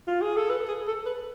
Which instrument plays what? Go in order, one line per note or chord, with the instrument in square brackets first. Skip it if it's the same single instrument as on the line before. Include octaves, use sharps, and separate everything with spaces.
[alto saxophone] F4
G#4
A4
B4
G#4
A4
B4